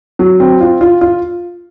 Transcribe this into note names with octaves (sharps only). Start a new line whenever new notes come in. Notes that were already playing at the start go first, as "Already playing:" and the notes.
F#3
C4
F4
F4
F4